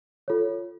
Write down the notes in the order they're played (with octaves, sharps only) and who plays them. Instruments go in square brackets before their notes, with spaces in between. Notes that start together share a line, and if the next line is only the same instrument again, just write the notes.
[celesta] F4 A4 C#5